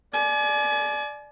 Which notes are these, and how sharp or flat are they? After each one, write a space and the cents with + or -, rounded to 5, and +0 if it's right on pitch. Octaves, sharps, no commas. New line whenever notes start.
D5 +10 G#5 +40